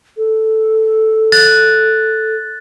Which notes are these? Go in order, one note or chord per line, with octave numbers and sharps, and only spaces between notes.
A4
F#6 A6